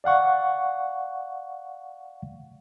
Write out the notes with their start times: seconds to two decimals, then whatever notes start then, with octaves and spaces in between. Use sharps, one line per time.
0.04 D5 F5 F#5 C#6